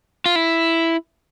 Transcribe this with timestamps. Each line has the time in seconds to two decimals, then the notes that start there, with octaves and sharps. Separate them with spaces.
0.26 F4
0.36 E4